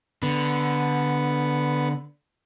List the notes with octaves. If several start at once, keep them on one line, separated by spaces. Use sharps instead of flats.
D3 B3